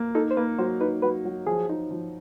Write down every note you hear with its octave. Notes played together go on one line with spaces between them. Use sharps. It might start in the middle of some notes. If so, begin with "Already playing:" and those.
Already playing: A#3
D#4 A4
C5
A#3 B4
F#3 C5
D#4 B4
F#3 B4
F#3
F3 G#4
D#4
F3